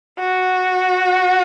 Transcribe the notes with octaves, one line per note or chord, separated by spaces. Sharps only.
F#4